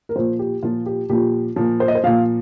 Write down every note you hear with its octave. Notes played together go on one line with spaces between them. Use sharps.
A#4
A#2 F3 C5
G4
A#2 F3 F4
G4
A#2 F3 G4
A#2 F3
C5
D#5
C5
A#2 F3 F5